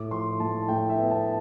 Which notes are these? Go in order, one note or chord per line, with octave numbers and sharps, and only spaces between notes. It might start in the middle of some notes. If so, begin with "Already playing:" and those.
Already playing: A2 D6
F3 C6
A2 A5
A2 G5
E5
B3
A5